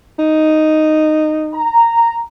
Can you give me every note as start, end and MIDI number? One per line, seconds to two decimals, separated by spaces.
0.19 1.68 63
1.54 2.21 82